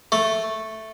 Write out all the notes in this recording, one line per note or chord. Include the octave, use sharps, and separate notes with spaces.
A3